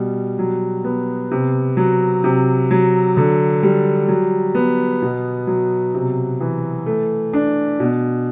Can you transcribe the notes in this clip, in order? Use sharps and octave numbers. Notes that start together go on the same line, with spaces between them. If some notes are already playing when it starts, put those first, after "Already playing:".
Already playing: B2 G3
F#3
B3
C3
F#3
C3
F#3
D3
G3
F#3
B3
B2
F#3
C3
E3
A3
D4
B2